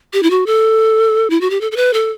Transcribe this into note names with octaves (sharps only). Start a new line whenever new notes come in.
G4
E4
F#4
A4
E4
F#4
G4
A4
A4
B4
A4